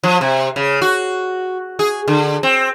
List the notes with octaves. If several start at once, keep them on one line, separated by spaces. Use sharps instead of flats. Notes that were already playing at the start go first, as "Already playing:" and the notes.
F3
C3
C#3
F#4
G#4
D3
C4